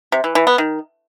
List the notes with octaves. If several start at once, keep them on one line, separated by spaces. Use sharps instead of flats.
C3
E3
E3
B3
D#3